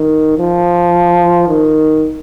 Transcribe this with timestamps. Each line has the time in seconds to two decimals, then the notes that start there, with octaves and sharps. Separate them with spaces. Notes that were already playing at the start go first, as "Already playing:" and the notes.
Already playing: D#3
0.39 F3
1.48 D#3